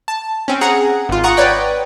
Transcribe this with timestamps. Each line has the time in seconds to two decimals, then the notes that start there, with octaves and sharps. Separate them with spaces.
0.08 A5
0.48 C4 C#4
0.61 G#4 F#5 A#5
1.09 G#1 F4
1.24 F#5 A#5 C#6 D#6 F#6
1.37 B4 C#5 D5 G5